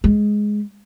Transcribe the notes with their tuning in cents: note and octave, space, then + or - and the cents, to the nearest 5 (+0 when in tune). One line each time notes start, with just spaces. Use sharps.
G#3 +5